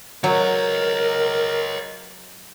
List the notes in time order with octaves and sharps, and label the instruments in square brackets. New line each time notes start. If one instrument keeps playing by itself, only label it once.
[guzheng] F#3 [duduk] A#4 [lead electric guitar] C#5 D#5